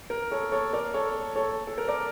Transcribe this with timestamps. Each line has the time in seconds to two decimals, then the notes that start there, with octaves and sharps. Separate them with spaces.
0.10 A#4
0.31 A4 C#5
0.52 A4 C#5
0.73 A#4 D5
0.94 A4 C#5
1.36 A4 C#5
1.67 A4
1.78 A#4
1.88 A#4 D5